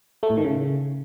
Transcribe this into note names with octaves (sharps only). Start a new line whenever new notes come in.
A3
A2
D#3
C#3